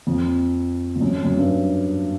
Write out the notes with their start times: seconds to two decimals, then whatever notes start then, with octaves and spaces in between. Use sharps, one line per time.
0.07 F2
0.96 F2
1.01 F#2
1.25 F#2
1.36 G2